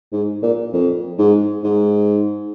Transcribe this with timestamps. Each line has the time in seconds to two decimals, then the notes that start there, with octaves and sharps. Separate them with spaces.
0.12 G#2
0.43 A#2
0.73 F2
1.19 G#2
1.64 G#2